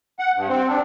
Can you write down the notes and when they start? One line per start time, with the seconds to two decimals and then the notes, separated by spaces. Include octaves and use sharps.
0.19 F#5
0.36 G2
0.49 C4
0.68 D4